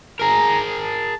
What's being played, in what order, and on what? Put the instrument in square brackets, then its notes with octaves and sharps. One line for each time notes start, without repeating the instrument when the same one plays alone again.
[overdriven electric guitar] G#4 A#4 [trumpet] A#5
[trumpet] A5